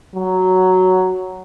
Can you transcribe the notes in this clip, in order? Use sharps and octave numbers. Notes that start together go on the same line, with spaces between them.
F#3